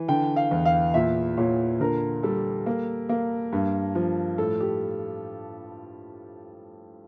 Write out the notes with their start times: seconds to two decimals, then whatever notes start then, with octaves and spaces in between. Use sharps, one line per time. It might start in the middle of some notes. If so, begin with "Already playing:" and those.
Already playing: E3
0.08 D3 G5
0.36 F5
0.51 E2
0.65 F5
0.94 A#2 E5
1.37 A#2 C#5
1.80 D3 A#4
2.23 G3 A4
2.66 A#3
3.09 A#3
3.53 G2
3.95 F3
4.38 A2 A4
4.60 G4